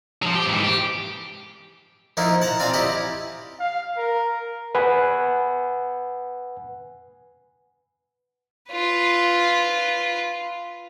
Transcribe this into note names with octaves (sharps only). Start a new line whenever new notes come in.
F3 F#3
G4
G#2 E3
G4
F3 A#3 D#4 E4
F#5 A5 A#5
C4 F4 D5 G#5 A#5
E4 G4 D#5 B5
F5
A#4
B4 F#5 G#5
F4 B4